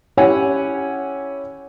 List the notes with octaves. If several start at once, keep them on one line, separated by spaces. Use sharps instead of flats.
C#4 E4 G4 C#5 F#5 G#5